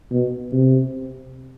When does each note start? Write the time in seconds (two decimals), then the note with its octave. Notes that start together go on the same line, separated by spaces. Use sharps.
0.12 B2
0.53 C3